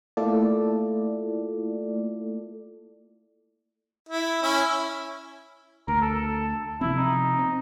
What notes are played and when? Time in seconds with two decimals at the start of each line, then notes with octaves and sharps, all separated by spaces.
0.17 A3 A#3 E4 F4 A4 D5
4.09 E4
4.42 C#4 E4
5.88 D2 A#4
6.02 A4
6.81 C3 F3 C4 E4
6.97 D#4
7.39 C4